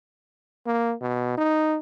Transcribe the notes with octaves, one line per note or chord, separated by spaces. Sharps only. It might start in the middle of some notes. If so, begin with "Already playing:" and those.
A#3
B2
D#4